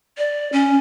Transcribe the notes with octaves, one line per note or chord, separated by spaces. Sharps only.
D5
C#4